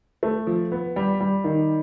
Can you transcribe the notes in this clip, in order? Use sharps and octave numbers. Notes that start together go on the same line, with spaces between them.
A3
F3
B3
G3
G3
D#3